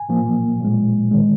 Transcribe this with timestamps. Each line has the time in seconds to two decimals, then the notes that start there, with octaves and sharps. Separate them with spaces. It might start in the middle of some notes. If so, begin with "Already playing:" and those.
Already playing: G#5
0.09 A#2 F3 A#3
0.60 A#2 F3 G#3
1.12 D#3 G#3